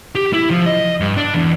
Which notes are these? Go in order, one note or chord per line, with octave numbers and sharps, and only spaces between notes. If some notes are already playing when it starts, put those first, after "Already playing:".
G4
E4
F3
D#5
G2
D4
E2